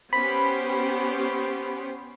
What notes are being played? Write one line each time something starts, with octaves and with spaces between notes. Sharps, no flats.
B3 C#4 G4 C5 B5